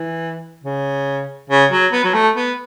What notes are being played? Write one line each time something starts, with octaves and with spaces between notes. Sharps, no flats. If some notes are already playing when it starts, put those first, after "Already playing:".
Already playing: E3
C#3
C#3
F#3
B3
F#3
A3
B3